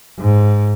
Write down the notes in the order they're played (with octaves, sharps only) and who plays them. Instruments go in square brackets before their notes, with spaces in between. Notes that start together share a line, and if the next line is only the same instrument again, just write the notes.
[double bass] G#2